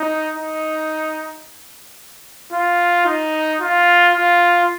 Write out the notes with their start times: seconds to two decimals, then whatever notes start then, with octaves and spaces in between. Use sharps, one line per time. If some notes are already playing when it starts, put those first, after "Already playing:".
Already playing: D#4
0.36 D#4
2.53 F4
3.06 D#4
3.61 F4
4.14 F4